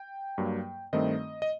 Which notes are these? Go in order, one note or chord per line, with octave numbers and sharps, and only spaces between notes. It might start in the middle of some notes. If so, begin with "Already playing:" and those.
Already playing: G5
G2 F#3 A#3
G2 D#3 A3 C4 D#5
D#5